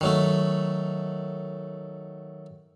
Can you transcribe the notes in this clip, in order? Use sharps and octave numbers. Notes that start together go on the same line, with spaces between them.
D#3 F#3 A3